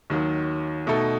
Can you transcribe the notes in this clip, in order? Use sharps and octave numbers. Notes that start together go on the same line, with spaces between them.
D#2 D#3 F#3
B2 A3 D#4 A4